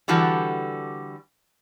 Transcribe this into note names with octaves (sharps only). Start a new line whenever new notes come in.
D3 E3 G3 F#4 A4